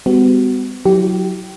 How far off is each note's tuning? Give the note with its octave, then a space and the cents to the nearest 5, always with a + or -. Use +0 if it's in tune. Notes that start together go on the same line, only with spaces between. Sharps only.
G3 +35 B3 +35 F#4 +20
F#3 +0 E4 +0 G4 -25